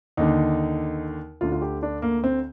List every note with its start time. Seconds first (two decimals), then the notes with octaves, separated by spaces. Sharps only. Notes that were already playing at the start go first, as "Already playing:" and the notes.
0.17 D#2 D3 D#4
1.41 D2 D3 F4
1.52 F4
1.62 G4
1.83 D4
2.02 A#3
2.24 C4